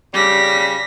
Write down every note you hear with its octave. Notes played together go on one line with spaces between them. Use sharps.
C#3 G3 A#6 B6